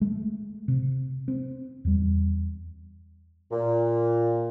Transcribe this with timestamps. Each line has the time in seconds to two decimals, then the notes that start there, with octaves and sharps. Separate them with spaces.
0.01 G#3 A3
0.68 C3
1.28 C4
1.85 E2 G3
3.51 A#2